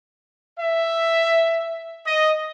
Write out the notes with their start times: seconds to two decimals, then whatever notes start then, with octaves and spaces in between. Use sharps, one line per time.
0.59 E5
2.06 D#5